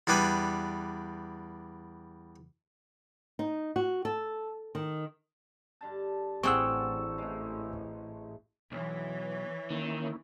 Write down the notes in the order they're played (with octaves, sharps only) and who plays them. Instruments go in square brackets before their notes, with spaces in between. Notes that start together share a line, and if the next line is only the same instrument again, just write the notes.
[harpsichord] E2 G3 D4 B4 G#5
[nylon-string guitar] D#4
F#4
A4
D#3
[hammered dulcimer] G2 D3 A5
[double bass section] A1 [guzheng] C4 G#4 F#5 [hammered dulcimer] A4 [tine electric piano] C#6 E6
[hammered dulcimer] G#3 A3
[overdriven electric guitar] B1 [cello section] E3 [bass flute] C#5
[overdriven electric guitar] D#3 [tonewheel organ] A#3 C#4 E4